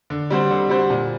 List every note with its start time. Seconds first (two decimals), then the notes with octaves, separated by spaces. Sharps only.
0.10 D3
0.30 G3 C4 F#4 C5
0.51 D3
0.69 G3 C4 F#4 C5
0.90 A#2